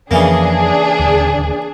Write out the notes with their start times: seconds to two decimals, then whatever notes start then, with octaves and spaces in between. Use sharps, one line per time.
0.11 F2 C#3 E3 F3 A#3 D4 G#4
0.99 D1 D#2 D3